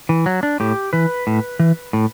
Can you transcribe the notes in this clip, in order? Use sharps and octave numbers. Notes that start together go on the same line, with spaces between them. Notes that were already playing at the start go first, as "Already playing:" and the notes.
E3
F#3
D4
A2 G4
E3 B4
A2
E3
A2